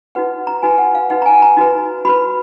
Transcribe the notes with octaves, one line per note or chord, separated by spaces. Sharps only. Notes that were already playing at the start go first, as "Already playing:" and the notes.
D#4 F#4 B4 F#5
A#5
D#4 F#4 B4 G#5
F#5
F5
D#4 F#4 B4 F#5
A#5
G#5
A#5
D#4 F#4 B4
F#4 B4 B5